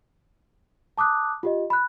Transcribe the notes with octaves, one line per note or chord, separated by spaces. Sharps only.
A5 D6 D#6 F#6
F4 G4 D#5
B5 F#6